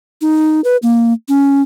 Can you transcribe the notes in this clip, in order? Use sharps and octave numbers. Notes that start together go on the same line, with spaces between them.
D#4
B4
A#3
C#4